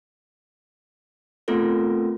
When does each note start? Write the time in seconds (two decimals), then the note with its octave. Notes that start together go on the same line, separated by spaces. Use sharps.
1.48 A3 B3 C4 F4 A4 A#4